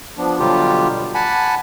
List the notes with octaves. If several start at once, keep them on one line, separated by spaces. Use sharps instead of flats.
F3 B3 D4
B2 D3 F#3 G3 F4 G4
F#5 G#5 A5 B5